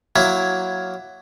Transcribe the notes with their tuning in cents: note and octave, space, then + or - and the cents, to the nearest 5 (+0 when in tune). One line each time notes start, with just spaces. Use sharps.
F#3 +0 A#3 +0 E4 +15